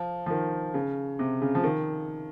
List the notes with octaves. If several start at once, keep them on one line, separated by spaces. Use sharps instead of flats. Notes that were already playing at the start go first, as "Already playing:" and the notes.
Already playing: F3
F3
D#3
C#3
C3
C#3
F3
D#3